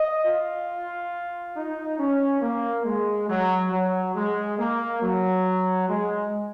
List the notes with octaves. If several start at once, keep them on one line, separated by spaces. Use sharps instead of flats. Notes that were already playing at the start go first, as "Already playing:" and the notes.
Already playing: D#5
F4
D#4
C#4
A#3
G#3
F#3
F#3
G#3
A#3
F#3
G#3